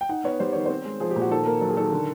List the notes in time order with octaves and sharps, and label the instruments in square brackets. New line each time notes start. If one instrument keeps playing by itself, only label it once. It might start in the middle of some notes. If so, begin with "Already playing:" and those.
[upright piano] G5
D#4 F#5
B3 C#5
G3 C5
D#3 C#5
C4 C5
G#3
F3 G#4
G4
A#2
F#4
D#3 A4
A#3 A#4
F#3 A4
G#4
D#3 A4
D3